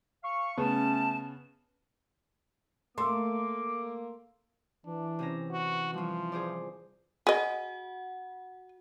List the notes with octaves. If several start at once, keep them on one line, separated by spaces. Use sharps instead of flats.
F5 C#6
C#3 A3 B3 C#4 A5
A3 A#3 C6 D6 E6
E3 D4
C3 C#4 A#5
F#4
F3 G3 F4
G#4 C5 D5
F#4 G#4 D#5 F#5